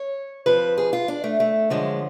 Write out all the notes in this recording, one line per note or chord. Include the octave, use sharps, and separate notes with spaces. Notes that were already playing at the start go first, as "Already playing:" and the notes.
Already playing: C#5
F2 F3 B4
G#4
F4
D4
A3
A3
F#2 D3 F3 G#3